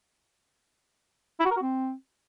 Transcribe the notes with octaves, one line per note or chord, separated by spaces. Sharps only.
E4
F#4
A#4
F#4
C4